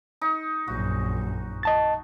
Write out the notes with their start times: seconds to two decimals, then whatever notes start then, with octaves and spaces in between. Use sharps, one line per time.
0.21 D#4
0.68 A#1 F#2 F#4
1.63 D#5 A5 A6